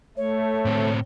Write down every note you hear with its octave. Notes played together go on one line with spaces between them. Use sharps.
A3 C#5
A2 C4